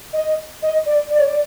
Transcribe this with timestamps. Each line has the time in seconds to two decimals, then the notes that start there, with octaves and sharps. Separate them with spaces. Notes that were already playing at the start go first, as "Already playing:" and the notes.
0.13 D#5
0.62 D#5
0.86 D5
1.10 D5
1.18 C#5
1.25 D5